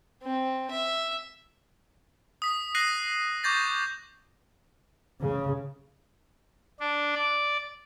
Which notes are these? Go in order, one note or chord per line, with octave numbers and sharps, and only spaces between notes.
C4
E5
D#6 B6
F#6 A#6 C7 D#7 F#7
C#6 D6 G6 A6 A#6
C#3
D4
D5